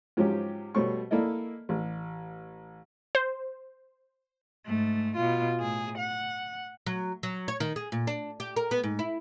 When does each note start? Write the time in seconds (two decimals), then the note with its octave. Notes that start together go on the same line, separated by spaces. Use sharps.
0.17 G#2 F3 F#3 C#4 G4
0.75 B2 G3 A3 C5 C#5 C#6
1.11 A#3 E4 A4 D5 D#5
1.69 A1
3.15 C5
4.66 G#2 A3
5.16 B2 F4
5.60 A2 G#4
5.98 F#5
6.87 F#3
7.23 F#3
7.48 C#5
7.60 D#3
7.76 G#4
7.92 A#2
8.07 D4
8.40 G4
8.56 A#4
8.71 B3
8.84 G#2
8.99 E4